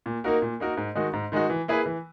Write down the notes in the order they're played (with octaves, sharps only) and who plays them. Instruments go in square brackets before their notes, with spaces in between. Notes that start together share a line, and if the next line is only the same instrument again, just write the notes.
[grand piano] A#2
A#3 D#4 F#4 A#4
A#2
A#3 D#4 F#4 A#4
G#2
D#3 G#3 D#4 F#4
G#2
D#3 G#3 D#4 F#4
E3
A#3 E4 G#4 B4
E3